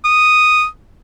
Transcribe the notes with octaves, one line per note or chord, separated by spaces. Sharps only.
D#6